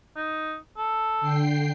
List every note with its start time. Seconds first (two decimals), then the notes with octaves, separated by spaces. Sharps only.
0.16 D#4
0.77 A4
1.21 D3 G5 C7